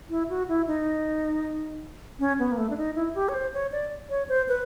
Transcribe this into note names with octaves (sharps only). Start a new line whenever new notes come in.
E4
F#4
E4
D#4
C#4
B3
A#3
A3
D4
D#4
E4
G4
C#5
C5
C#5
D5
C#5
C5
B4